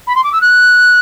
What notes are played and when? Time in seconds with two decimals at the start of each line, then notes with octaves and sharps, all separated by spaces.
0.07 B5
0.15 C6
0.24 D6
0.32 E6
0.41 F#6